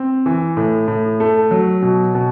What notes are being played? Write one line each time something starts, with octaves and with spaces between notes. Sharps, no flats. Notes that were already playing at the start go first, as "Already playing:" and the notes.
Already playing: C4
E3
A2
A2
A3
F#3
B2
B2